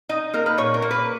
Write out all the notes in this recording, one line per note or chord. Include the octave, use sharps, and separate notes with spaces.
D#4 D#5
A#3 A#4
B4
A#2 C#5
A#4
A#3
B4